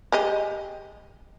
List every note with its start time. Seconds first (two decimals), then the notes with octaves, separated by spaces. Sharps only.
0.12 G#3 G4 D#5